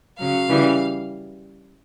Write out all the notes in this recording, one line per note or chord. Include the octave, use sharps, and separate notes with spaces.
C#3 F#3 F5
C#3 E3 G3